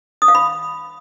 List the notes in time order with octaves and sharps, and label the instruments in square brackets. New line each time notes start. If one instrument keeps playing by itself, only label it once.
[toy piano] D#6
F5
B5